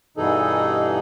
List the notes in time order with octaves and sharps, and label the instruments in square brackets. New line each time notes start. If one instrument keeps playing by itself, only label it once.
[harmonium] G2 B2 E3 D#4 G#4 A4